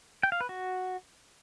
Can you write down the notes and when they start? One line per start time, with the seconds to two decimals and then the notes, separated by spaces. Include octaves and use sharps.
0.23 G5
0.32 F5
0.41 B4
0.49 F#4